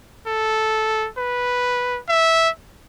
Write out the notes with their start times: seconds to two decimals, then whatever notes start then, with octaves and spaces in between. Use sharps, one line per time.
0.27 A4
1.18 B4
2.09 E5